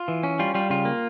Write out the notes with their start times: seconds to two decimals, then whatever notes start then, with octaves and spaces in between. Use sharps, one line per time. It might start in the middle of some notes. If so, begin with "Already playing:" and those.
Already playing: F4
0.08 E3
0.23 C#4
0.39 G3 F4
0.55 G3 F4
0.70 C#3 F4
0.85 A#3